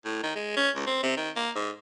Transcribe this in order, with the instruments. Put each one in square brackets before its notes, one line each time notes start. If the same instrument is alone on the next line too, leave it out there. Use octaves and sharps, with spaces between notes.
[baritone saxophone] A2
D#3
G#3
C#4
C#2
C4
C3
D#3
A#3
G#2